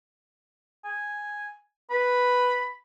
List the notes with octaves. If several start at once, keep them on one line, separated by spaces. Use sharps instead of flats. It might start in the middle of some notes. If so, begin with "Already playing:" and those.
G#5
B4 B5